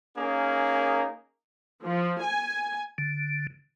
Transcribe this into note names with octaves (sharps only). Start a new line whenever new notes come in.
A#3 C#4 D#4 G#4 A#4
F3
G#5
D3